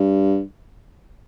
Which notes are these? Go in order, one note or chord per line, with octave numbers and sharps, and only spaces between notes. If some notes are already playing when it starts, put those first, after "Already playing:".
Already playing: G2